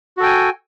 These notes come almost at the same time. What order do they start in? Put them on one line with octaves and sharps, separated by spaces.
F#4 A4 G5 G#5